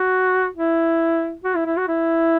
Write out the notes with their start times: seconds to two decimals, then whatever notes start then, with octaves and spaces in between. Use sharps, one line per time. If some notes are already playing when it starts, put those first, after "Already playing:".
Already playing: F#4
0.56 E4
1.44 F#4
1.55 E4
1.66 E4
1.77 F#4
1.88 E4